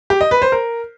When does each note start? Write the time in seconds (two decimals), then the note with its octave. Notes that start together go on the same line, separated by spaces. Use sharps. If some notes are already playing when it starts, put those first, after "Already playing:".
0.10 G4
0.21 D#5
0.31 B4
0.42 C5
0.52 A#4